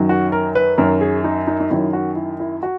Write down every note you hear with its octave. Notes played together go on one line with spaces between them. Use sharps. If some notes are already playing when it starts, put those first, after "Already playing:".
Already playing: F#2 D#3 F#3
F#4
A#4
B4
F#2 D#3 F#3 A#4
G#4
D#4
D#4
D#4
F#2 D#3 F#3 E4
F#4
E4
E4
F#4